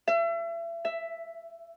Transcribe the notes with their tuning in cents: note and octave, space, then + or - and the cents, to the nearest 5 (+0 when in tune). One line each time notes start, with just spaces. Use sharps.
E5 +35
E5 +5